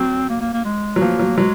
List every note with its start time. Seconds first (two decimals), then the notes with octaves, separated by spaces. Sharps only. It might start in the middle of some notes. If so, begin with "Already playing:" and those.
Already playing: F#3 C4
0.30 A#3
0.41 A#3
0.54 A#3
0.65 G#3
0.96 F#3
1.01 F3 A#3
1.19 F#3
1.37 F#3 G#3